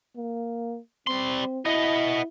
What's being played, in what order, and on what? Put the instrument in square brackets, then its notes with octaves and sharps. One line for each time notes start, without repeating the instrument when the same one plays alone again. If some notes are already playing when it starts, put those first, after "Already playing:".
[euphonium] A#3
[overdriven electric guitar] G3 C6 [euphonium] C4
[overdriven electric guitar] B3 D#5 [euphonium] E4